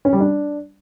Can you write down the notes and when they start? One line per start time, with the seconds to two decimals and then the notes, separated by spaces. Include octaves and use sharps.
0.05 C#4
0.13 G3
0.20 D4